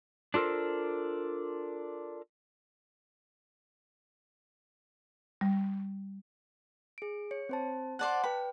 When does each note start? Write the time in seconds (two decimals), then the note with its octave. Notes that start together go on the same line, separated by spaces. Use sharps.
0.34 D4 F4 A4 A#4 C5
5.41 G3
6.98 G#4 D7
7.31 C#5 C#7
7.49 C4 C5 A5
7.99 C5 D5 F#5 A5 F#6
8.24 B4 G5 B5